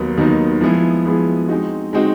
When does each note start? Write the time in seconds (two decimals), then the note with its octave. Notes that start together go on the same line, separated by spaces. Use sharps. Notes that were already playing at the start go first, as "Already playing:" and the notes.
Already playing: D#2 D#3 F#3 B3 D#4
0.17 D#2 D#3 F#3 B3 D#4
0.61 F3 G#3 B3 E4 G#4
1.05 F3 G#3 B3 E4 G#4
1.48 G#3 C4 D#4 F#4
1.93 G#3 C4 D#4 F#4